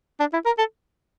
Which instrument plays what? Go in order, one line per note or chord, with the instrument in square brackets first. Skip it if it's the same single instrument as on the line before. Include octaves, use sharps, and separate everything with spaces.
[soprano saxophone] D4
E4
A#4
A4